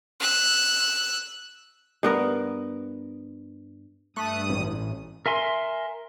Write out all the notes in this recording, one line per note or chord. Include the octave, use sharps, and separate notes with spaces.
E6 F#6
G2 B3 A#4
G2 A3 D#6 F#6
A1
A#4 E5 G#5 C6